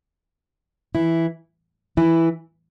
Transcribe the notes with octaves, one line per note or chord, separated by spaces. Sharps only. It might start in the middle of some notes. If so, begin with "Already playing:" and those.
E3 E4
E3 E4